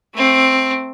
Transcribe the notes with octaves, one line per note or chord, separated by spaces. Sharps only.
A3 C4